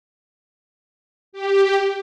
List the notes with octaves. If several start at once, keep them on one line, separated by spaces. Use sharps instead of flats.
G4